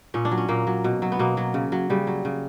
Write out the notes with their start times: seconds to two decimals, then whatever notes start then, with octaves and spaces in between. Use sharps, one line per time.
0.14 A#2 C#4
0.25 D4
0.31 F#3
0.38 C#4
0.49 A#2 A#3
0.67 F#3
0.84 B2
1.02 F#3
1.12 B3
1.19 B2 A#3
1.37 F#3
1.54 C#3
1.72 F#3
1.90 C#3 G3
2.07 F#3
2.25 C#3